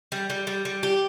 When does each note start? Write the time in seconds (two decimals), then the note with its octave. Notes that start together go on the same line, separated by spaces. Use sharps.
0.12 G3
0.30 G3
0.47 G3
0.65 G3
0.83 G4